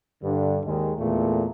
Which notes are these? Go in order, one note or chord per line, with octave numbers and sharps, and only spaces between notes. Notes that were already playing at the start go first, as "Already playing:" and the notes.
G2 D3
D#2 D#3 G#3
E2 A#2 A3